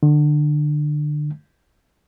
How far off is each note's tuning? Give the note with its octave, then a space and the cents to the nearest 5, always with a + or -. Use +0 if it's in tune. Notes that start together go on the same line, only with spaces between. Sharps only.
D3 +25